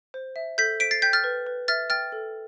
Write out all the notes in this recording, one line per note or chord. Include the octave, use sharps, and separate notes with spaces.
C5
E5
A4 G6 B6
C5 B6 D7
A6 C7
G5 G6 B6
F6 A6
B4
B4
E5 F6 A6
G5 F6 A6
A4